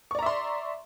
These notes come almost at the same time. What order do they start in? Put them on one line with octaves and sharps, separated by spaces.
C#6 D5 A#5 E5 C6